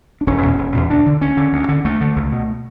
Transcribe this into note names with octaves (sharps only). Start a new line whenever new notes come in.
D4
E1 C#4
E2 B2
E1
E2 B2
D2 D4
D3
D2 C#4
D3
D2
D3
D2 A3
D3
C#2
B2